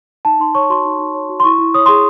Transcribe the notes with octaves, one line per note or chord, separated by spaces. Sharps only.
D#4 A5
D#4 C6
C#5 C#6
F#4 C6
D#4
D#4
C#5
F#4
C6
E4 C#6
E4
C#5 D#6
G#4 C6